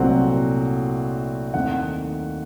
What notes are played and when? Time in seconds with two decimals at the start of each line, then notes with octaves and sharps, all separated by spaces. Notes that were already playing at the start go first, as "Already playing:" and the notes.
Already playing: C2 A#2 F#3 A3 C4 F#5
1.54 D#2 D#3 A3 C4 F#5